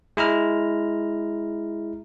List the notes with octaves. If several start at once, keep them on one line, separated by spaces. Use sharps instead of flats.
G#3 E4 A#5 F6